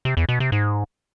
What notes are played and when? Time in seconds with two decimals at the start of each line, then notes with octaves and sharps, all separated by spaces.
0.05 C3
0.17 E2
0.29 B2
0.40 C3
0.52 G#2